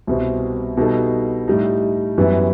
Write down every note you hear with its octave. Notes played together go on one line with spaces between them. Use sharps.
C2 B2 G3 C4
B2 G3 D#4 A4
A2 G3 D#4
F#2 E3 G3 B3 E4